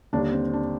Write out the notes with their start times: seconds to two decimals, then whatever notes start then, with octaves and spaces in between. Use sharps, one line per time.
0.13 D#2 D3 G3 D4
0.32 C4
0.53 D4